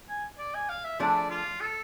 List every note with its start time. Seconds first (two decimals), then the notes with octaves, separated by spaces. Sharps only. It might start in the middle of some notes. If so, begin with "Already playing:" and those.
0.09 G#5
0.39 D5
0.54 G#5
0.69 F5
0.84 E5
0.99 F3 A3 D4 G#4 D5
1.30 F4
1.61 A4